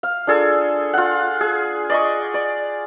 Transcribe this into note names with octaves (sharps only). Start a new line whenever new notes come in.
F5
D4 F4 G#4 A4
F4 F#5
G#4
D5 D#5 C#6
D5